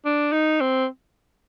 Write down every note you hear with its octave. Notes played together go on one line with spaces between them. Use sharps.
D4
D#4
C4